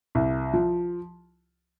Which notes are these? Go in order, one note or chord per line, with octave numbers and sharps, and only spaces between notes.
C2
F3